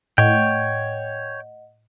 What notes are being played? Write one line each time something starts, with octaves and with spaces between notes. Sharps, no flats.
A2 C#5 D#5 F#5 G5